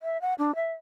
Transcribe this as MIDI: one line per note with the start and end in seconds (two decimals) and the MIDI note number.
0.01 0.20 76
0.21 0.34 78
0.38 0.55 62
0.55 0.72 76